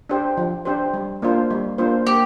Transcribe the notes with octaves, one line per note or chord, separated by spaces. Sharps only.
D4 G4 C5
F3
D4 G4 C5
G3
A#3 D4 F4 C5
G3
A#3 D4 F4 C5
A#3 G4